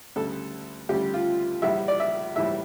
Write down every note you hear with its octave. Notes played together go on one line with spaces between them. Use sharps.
D2 C#3 G3 A4
D2 C#3 G3 G4
F4
A#1 A2 E3 G3 E5
D5
E5
A#1 A2 E3 G3 E5